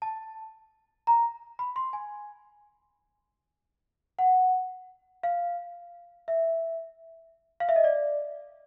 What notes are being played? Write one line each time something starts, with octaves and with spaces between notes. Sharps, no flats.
A5
A#5
B5
C6
G#5
F#5
F5
E5
F5
E5
D#5
D5